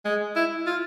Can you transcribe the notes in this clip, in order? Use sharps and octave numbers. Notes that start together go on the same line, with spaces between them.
G#3
E4
F4